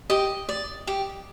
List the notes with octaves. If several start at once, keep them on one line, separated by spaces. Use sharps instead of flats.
G4 D#5
D5
G4